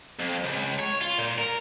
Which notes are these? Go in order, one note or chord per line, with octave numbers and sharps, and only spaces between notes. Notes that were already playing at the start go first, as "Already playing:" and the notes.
F2
C#2
C#5
F4
A#2
A#4